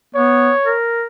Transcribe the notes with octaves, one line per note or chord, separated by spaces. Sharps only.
B3 C#5
A#4